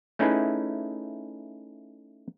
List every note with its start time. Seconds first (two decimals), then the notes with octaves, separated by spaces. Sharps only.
0.19 A3 C#4 D#4 E4 G#4 B4